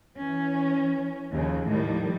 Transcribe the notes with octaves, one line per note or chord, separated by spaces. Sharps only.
E3 C#4
D#2 C#3 F3
A2 D#3 F3 G3